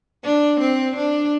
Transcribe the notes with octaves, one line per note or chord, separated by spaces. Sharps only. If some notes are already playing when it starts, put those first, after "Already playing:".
D4
C4
D4